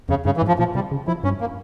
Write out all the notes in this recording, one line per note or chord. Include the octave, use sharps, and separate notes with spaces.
F2 C#3
G2 C#3
E3
G#2
F3
A#2 F3
C3 G3
C#3
F3 E4
G2 C#4
A#3